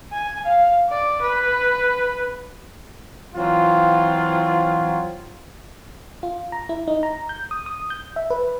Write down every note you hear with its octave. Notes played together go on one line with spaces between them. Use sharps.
G#5
F5
D5
B4
E3 F#3 C4 F4
F4
A#5
E4
D#4
A#5
G6
D#6
D#6
G6
E5
B4